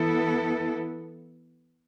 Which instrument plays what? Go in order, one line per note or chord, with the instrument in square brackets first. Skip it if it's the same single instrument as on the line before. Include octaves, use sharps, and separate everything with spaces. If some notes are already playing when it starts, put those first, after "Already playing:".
Already playing: [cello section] E3 B3 E4 A4